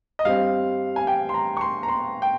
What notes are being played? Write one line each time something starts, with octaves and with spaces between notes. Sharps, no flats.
D#5
G2 G3 C4 F5
G#5
G5
C6
A#5
C#6
C6
A#5
C6
G5